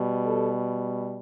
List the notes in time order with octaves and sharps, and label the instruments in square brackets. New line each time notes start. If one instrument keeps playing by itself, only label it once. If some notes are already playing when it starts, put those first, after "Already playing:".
Already playing: [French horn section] B2 G3
G4 A4